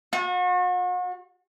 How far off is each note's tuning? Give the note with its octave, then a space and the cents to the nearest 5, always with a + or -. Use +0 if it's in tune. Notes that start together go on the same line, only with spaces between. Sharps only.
F#4 -40